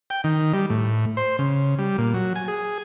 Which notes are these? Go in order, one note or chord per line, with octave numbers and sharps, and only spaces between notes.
G5
D#3
G3
A2
C5
C#3
G3
A#2
F#3
G#5
G#4